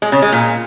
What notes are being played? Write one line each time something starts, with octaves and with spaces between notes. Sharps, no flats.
G#3
C#3
G#3
A#2